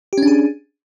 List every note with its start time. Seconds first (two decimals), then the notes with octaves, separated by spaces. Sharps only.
0.13 G4
0.18 C#4
0.23 D4
0.27 G#4